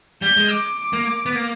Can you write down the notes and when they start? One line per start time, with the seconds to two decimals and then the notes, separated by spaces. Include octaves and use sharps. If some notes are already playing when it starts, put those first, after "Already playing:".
0.22 G3 G6
0.37 G#3
0.51 D6
0.79 D6
0.93 A#3
1.26 B3
1.35 A#3